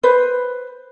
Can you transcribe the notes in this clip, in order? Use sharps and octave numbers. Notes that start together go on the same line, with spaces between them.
B4 C5